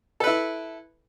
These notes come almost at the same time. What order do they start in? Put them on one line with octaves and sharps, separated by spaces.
A4 B4 E4